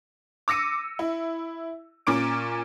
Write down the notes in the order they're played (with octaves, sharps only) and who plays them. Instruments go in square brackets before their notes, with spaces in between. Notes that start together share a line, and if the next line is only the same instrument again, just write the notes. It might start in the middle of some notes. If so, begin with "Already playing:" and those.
[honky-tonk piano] D6 E6 A#6 C#7 D#7
E4
A#2 C#4 D6 D7